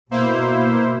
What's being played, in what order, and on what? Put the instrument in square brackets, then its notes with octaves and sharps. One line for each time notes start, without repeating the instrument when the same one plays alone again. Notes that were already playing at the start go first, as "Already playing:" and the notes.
[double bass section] B2 [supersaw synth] A#3 E4 C5